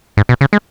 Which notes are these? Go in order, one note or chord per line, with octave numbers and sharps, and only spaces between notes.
G#2
B2
C#3
G#3